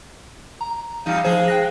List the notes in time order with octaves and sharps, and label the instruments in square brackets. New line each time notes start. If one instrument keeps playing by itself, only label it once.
[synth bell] A#5
[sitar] E2 G3 D#4 [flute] F5
[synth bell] F3 C5 [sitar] G#3 G#4
[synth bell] G5 F#6 A#6